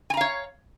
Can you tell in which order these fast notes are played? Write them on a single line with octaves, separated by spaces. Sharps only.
G#5 A#5 F5 C#5